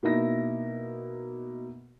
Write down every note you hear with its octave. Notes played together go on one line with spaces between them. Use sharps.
B2 A#3 D#4 E4 A#6